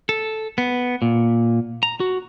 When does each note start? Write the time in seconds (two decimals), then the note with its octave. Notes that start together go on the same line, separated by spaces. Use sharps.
0.09 A4
0.58 B3
1.02 A#2
1.83 A#5
2.00 F#4